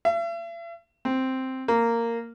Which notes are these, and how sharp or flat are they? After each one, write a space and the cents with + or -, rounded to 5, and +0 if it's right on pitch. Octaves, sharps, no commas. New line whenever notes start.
E5 +45
C4 +0
A#3 -10